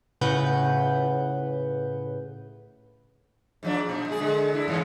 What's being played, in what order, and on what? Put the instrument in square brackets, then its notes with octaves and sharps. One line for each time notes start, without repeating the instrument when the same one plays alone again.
[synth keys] A2 C#3 B4 F#5 G6
[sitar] G#2 F3 D4
A#2
G#3 G#4
D3 G#3
D4 E4
G2 C#3 E3